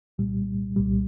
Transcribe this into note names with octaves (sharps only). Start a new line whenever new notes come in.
C2 A#2 G3
C2 A#2 G3